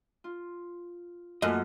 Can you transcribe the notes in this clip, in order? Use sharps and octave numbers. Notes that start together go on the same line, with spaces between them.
F4
F#2 A3 A#3 F4 D#5